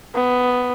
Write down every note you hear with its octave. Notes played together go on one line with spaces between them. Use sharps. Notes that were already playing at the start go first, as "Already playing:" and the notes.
B3